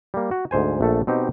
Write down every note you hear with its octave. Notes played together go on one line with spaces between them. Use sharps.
G3 A#3
F#4
D2 G#2 C5 G#5
A#1 A3 A4
B2 C4 D#4 G4